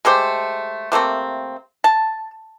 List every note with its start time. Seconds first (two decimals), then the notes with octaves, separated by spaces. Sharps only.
0.05 G#3 A3 G4 C5
0.92 C3 A3 A#3 C4
1.84 A5